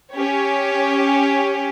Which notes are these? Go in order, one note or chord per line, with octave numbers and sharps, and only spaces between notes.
C#4 G4 C#5